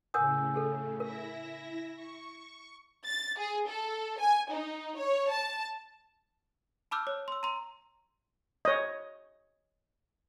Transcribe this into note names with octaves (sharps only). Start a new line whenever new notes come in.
A2 C#3 A#4 F#5 G#5 D#6 E6 G6
G#4 A4
E4 A#4 E5 A#6
C#6
A6
G#4
A4
G#5
D#4
C#5
A5
A5 B5 D6 E6 F6 G6
C#5
C6 E6
A#5 C6
C#5 D#5